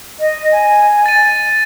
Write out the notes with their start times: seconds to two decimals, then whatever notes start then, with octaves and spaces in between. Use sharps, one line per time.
0.20 D#5
0.52 G#5
1.06 A6 D#7